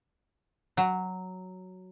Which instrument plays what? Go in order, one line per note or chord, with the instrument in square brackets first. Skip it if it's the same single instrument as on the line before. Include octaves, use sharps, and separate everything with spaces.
[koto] F#3